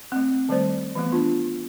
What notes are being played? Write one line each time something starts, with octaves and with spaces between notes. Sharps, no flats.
A3 C4
D#3 G3 A3 C5 D5
E3 A3 B3
D4 F4